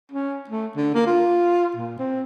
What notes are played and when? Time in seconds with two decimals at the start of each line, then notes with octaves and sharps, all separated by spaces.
0.12 C#4
0.49 A3
0.77 D3
0.94 A#3
1.07 F4
1.76 A#2
1.99 C4